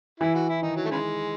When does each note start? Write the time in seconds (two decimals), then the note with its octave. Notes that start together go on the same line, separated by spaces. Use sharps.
0.20 E3 E4
0.35 F#4
0.49 E4
0.62 D#3 D#4
0.76 F#3
0.85 A3
0.91 C#3 E3 G#3